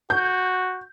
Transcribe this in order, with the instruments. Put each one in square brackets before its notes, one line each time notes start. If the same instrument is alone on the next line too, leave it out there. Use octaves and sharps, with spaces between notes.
[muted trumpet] F#4 [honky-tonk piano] G6